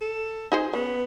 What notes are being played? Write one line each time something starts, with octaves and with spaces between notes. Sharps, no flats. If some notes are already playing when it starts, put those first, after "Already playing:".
A4
D#4 G#4 C5
C#3 B3